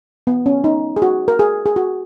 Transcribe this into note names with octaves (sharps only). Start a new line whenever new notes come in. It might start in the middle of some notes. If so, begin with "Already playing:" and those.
B3
C#4
D#4
G#4
F#4
A#4
G#4
G#4
F#4